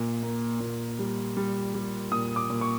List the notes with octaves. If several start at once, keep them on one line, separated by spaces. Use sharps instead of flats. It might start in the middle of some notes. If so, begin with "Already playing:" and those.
Already playing: A#2
A#3
A#2
G3
G3
G3
A#2 D#6
D6
A#2
C#6